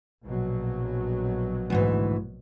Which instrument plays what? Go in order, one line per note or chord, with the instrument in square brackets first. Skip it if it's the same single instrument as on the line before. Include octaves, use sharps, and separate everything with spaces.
[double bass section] A#1 B2 F#3
[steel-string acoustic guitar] D2 G#2 E3